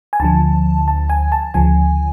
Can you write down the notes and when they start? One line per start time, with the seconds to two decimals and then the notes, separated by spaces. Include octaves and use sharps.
0.13 G#5
0.20 D2 D3 F3 A5
0.88 A5
1.10 G#5
1.32 A5
1.54 D2 C#3 F3 G#5